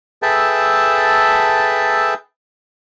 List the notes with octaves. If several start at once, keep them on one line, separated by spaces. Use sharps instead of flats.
G#4 A4 B4 E5 G5 A5